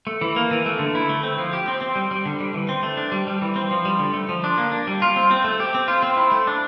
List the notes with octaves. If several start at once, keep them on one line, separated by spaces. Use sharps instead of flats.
A3
E3
A#3
E3
A3
D3
E4
A3
C4
F3
G4
C4
C4
G3
G3
D3
G3
E3
C4
A3
D4
G3
G3
E3
C4
F3
G3
D3
A3
F3
D4
A#3
D4
G3
F4
C4
C4
A3
G4
C4
F4
C4
E4
A3
D4